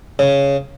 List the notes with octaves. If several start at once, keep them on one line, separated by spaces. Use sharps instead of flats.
C#3